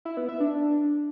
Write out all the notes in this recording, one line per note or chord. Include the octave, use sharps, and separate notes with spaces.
E4
B3
E5
D4